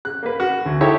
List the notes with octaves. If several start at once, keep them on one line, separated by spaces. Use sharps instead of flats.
F#6
A#3 B4
F#4
D2
D#4 E4 G4 A4 C#5